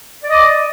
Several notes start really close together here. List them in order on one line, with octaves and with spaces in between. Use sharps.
D5 D#5 D6